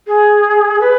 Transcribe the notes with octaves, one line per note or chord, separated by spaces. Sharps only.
G#4
B4